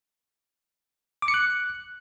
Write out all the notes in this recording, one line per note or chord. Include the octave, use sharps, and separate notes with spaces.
D6
C#7
F#6